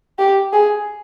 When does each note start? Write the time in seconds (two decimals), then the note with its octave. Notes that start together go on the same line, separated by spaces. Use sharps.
0.19 G4
0.53 G#4